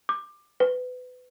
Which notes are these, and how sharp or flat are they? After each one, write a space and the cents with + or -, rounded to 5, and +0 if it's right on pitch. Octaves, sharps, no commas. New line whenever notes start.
D6 +20
B4 +25